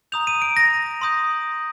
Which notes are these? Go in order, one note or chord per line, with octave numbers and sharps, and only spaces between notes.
A#5 D#6 G6 F7
D#7
D7
A#6
C6 D#6 G6